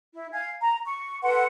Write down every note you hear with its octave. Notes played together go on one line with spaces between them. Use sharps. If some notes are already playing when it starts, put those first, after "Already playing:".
E4
F5 G#5 G#6
A#5
C#6
A4 B4 F#5 C6